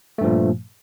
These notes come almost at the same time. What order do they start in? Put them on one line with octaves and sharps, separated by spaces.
A3 G2 F3 A#2